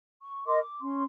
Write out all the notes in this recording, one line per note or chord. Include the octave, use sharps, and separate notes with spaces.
C#6
A#4 D#5 C6 D6
D6
C#4 C6